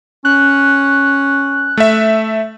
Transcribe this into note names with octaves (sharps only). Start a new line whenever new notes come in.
C#4 F#6
A3 E5